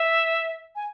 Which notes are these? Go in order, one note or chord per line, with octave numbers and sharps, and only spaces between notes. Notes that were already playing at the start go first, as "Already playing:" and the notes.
Already playing: E5
G#5